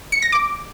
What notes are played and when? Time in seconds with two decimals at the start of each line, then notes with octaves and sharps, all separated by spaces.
0.12 C#7
0.22 A#6
0.32 D6